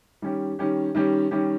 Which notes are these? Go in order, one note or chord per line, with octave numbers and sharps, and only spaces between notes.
D#3 G3 C#4 G4
D#3 G3 C#4 G4
D#3 G3 C#4 G4
D#3 G3 C#4 G4